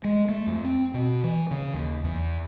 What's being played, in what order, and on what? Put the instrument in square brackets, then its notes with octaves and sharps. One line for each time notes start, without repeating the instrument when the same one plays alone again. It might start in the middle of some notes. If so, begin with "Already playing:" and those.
[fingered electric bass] G#3
A3
F2
C4
B2
E3
C#3
D#2
E2